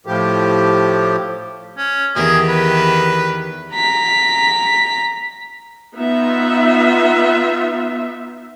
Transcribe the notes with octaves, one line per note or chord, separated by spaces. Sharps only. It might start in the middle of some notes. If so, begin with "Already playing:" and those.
A2 F3 G4
C#4
E2 D#3 G4 G#4
B4
A#5 B6
B3 D#4 F4 E5